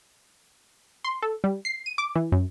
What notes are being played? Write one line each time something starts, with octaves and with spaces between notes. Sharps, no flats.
C6
A4
G3
C7
D#7
D6
E3
F#2